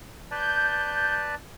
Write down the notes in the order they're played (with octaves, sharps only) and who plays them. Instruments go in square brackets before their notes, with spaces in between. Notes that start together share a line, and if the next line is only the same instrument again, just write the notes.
[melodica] B4 D5 A5 [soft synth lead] G6